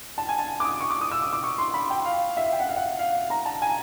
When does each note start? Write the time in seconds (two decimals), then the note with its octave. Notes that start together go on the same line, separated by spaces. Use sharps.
0.18 A5
0.29 G#5
0.39 A5
0.60 D6
0.65 D#6
0.81 C#6
0.90 D6
1.01 D#6
1.11 E6
1.22 D6
1.33 D6
1.43 C#6
1.58 C6
1.74 B5
1.90 G5
2.05 F5
2.37 E5
2.53 G5
2.60 F#5
2.69 F5
2.76 F#5
2.99 F5
3.30 A#5
3.45 A5
3.62 G#5